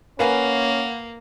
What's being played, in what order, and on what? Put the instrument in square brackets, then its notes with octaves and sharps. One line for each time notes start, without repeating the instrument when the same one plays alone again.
[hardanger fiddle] A#3 [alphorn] C#4 [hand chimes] A#4 F#5 [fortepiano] B4 F5 G#5